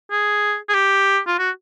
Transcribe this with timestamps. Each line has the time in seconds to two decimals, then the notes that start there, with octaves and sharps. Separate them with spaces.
0.11 G#4
0.69 G#4
0.74 G4
1.27 F4
1.39 F#4